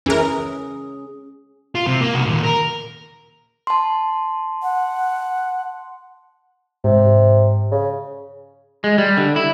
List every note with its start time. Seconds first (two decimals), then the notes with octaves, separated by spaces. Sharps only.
0.06 E3 C#4 G#4 A#4
1.75 F4
1.87 C3
2.01 A#3
2.14 C2 F#4
2.26 D#2 A#2
2.43 A#4
3.67 A5 C6
4.63 F#5
6.84 G#2 C3
7.72 C#3
8.84 G#3
8.98 G3
9.17 D3
9.36 E4